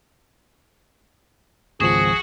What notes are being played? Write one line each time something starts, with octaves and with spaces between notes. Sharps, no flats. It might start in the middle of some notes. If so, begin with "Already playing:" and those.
G#1 C#2 F3 F#4 G#4 F#5